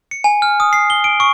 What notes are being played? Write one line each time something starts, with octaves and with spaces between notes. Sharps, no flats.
C#7
G#5
F6
D#6
C7
G7
D7
C#6